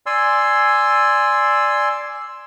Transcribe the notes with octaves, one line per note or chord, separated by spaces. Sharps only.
D5 G#5 C6 E6